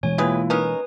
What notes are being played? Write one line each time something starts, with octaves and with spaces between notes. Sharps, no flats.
B2 E3 G#3 C#5 G#5
C3 A#3 E4 F4 G#4 B4
C#4 D#4 A#4 B4 G#5 D#6